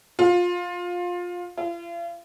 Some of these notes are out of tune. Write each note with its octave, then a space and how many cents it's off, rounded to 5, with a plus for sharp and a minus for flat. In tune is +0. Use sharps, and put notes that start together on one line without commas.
F4 +20
F4 -40